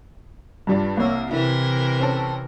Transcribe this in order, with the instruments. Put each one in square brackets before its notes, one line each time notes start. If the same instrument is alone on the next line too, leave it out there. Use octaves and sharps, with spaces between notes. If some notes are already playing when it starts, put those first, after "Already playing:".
[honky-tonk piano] G2 G3 F4
[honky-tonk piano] C2 C#5 E6 [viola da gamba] A#3
[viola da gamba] C3 E3 A#4 [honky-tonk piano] E4
[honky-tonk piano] C4 C#4 A4